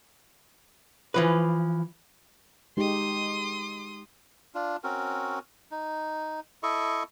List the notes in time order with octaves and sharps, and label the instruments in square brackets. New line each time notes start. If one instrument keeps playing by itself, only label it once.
[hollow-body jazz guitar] E3 F3 B4
[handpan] G#3 D#4 G4 [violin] C6 D#6
[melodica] D4 F4
C4 C#4 F#4 A#4
D#4
E4 A4 D#5 C#6